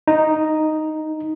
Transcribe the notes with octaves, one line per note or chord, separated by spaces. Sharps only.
D#4